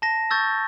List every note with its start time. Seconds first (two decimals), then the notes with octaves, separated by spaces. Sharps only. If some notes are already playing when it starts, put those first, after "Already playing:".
0.02 A5 A#6
0.31 C#6 E6 G6 A6